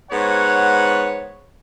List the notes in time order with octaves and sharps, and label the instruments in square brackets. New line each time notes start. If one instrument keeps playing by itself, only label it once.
[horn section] G#2 B3 C#5 [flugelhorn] F#5